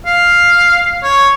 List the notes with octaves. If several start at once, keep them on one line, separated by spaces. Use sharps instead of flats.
F5
C#5